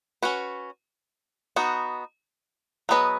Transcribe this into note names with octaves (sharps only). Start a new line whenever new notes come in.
C#4 F#4 B4
B3 D#4 F#4
F#3 B3 G#4 B4 D#5